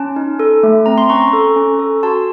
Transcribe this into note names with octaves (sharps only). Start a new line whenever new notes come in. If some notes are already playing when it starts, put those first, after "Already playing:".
Already playing: C#4 A5 C6
D#4
A4
A3
C4 A#5
C6
C#4 A#5 C#6
A4
C#4
A4
F#4 A5 C6